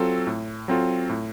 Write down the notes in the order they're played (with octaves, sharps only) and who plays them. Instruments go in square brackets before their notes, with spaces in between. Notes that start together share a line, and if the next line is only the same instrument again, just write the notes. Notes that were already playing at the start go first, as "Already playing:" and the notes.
Already playing: [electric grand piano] F#3 C4 F4 A4
A2
F#3 C4 F4 A4
A2